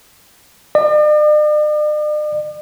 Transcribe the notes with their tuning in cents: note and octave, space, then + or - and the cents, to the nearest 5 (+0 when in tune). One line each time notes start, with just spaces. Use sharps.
D5 +45